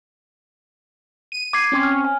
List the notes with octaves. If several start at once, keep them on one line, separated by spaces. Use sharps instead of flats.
D#7
D6 G#6 C7
C4 C#4
F6
G#5